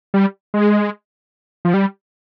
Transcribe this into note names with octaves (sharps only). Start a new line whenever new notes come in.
G3
G#3
F3
G3